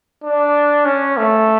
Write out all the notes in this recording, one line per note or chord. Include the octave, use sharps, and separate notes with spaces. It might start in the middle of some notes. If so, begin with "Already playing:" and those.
D4
C#4
A3